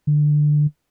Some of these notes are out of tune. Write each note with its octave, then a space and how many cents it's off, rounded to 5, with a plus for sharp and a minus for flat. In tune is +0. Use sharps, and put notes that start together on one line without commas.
D3 +15